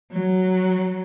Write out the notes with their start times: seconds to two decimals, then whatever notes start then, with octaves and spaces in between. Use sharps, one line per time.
0.13 F#3